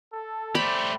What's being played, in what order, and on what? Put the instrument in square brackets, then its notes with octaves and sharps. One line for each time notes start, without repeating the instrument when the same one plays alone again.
[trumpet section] A4
[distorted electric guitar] A3 G4 [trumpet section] C5 D5 [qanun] B5